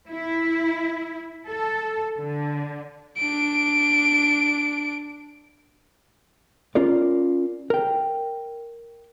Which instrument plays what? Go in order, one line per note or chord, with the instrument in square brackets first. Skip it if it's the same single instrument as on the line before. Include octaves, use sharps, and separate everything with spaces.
[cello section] E4
A4
D3
[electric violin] D4 D7
[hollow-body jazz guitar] C#4 F4 A#4 D5
A#4 G5